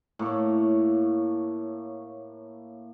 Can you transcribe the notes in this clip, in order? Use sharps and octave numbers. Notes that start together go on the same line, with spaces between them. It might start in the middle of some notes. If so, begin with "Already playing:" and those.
A2 A#3 C#5